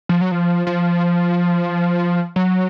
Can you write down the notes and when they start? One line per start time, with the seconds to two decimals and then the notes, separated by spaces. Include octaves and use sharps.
0.09 F3
0.21 F#3
0.31 F3
0.67 F3
2.36 F#3